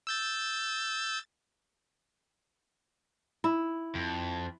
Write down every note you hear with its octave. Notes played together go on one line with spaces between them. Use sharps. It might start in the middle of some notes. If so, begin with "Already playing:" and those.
E6 G6 A6
E4
F2